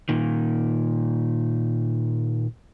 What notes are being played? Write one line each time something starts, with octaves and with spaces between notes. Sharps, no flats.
A#2 D#3